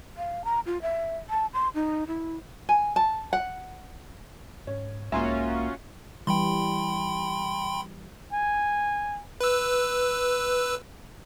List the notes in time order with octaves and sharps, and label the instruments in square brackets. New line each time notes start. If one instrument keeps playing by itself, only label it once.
[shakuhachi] F5
A#5
F4
E5
A5
C6
D#4
E4
[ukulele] G#5
A5
F#5
[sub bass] G#2 [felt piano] C#4
[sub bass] B1 [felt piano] G#2 [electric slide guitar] A#3 E5 [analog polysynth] C#4 F4 F#4
[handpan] E3 G3 [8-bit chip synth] G5 B5 C6
[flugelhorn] G#5
[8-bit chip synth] B4 E6